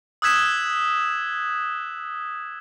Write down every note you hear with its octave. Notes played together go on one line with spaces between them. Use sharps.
D#6 E6 F#6 G#6 B6 E7